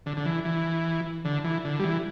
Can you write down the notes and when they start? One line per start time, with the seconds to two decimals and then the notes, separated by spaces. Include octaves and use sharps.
0.06 D3
0.17 D3
0.26 E3
0.45 E3
1.25 D3
1.44 E3
1.65 D3
1.80 G3
1.84 E3